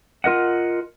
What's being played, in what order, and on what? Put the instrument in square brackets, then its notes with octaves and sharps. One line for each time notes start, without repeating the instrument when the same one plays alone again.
[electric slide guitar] F4 A#4 D#5 F#5